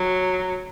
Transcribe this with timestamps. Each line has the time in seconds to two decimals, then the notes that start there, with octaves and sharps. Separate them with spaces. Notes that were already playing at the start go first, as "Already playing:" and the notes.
Already playing: F#3